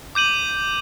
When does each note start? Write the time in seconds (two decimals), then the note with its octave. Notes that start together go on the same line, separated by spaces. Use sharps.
0.15 D6 G6 D#7 F#7